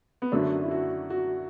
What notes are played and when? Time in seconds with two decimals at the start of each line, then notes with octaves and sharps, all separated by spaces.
0.22 B3
0.32 F#2 D3 F#3 A3 D4
0.64 E4
0.71 F#4
1.10 F#4